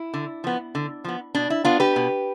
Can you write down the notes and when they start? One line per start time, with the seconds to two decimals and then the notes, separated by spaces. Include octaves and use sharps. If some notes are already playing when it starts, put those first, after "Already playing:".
Already playing: E4
0.14 D3
0.44 F3 B3
0.75 D3
1.04 F3 B3
1.34 B2 D4
1.50 E4
1.64 B3 D4 F4
1.80 G4 B4
1.96 B2